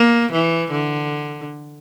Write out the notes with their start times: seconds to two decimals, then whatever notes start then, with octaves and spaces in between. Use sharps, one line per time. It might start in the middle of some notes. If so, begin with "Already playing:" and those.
Already playing: A#3
0.32 E3
0.71 D3